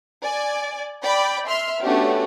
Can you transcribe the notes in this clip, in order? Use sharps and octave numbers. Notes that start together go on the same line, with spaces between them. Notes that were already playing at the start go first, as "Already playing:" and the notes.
D5 G#5
D5 G5 B5
E5 C6 F6
A3 B3 C#4 D4 F#4 G4